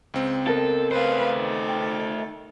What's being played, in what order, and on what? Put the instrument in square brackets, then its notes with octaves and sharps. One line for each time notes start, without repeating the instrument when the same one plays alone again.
[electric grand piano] C#2 C4
[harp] B3 A#4 D#5 [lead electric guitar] A4
[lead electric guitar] A3 C5 [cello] B4 F5
[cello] D#3 A4
[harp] G5